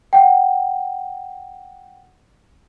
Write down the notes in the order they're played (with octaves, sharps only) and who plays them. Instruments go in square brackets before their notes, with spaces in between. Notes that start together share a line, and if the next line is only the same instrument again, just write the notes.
[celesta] F#5 G5